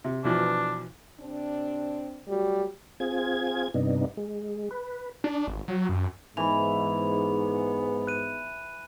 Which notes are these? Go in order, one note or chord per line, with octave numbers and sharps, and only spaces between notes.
C3
B2 E3 F3 D4
C3 C4 D4
F#3 G3 A3 F#4
C4 F4 G#4 G#6
G2 C3 B3 D4 D#4
G#3
B4
D4
G#1
F#3
F#2
G#2 E3 B3 B5 F7
F#6 D#7